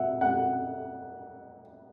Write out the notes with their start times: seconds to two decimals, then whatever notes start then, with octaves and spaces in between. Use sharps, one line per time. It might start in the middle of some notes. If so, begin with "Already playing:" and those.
Already playing: E5 F#5
0.21 F#5